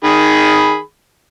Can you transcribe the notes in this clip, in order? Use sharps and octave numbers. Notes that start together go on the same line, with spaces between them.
D#3 G#4 B5